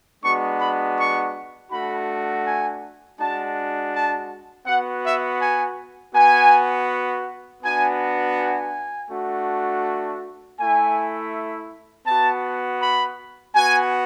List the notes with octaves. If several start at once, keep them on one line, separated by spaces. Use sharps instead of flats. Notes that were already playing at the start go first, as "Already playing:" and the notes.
G#3 B3 D4 F#4 C#6
B5
C#6
A3 D4 F#4 B5
G#5
G#3 D4 F#4 A5
A5
B3 F#4 F#5
E5
G#5
B3 F#4 G#5
B3 D4 F#4 G#5
G#5
A3 D4 F#4
A3 E4 G#5
B3 F#4 A5
B5
B3 F#4 G#5